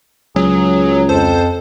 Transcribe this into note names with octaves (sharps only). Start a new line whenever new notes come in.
C#2 F#3 G#4
F2 A4 C5